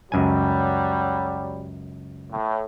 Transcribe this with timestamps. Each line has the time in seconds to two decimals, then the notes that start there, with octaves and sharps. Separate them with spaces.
0.12 C#2 F#2 F#3 G3 G#5
2.32 A2